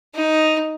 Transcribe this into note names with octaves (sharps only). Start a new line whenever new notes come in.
D#4